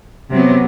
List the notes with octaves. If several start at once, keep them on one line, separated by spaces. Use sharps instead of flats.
C3 F#3 B3